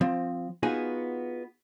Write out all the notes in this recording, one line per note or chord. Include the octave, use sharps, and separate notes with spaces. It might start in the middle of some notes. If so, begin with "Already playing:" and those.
F3 C4
B3 D#4 F4 F#4 G#4 G#5